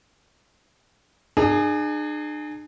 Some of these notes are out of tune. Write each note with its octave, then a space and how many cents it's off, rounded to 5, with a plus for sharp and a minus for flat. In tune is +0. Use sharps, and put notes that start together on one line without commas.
D4 +45 G#4 +5